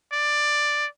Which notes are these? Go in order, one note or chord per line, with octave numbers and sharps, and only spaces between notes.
D5